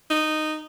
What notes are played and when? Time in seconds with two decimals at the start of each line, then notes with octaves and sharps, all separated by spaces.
0.10 D#4